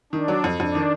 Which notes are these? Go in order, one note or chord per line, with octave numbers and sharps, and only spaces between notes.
D#3 D4
F#3
F2
F2 D4
D#3